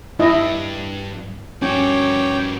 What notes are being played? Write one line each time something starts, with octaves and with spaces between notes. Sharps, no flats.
G2 E4 D#5
G2 C#4 F#4 C#5 G5 D6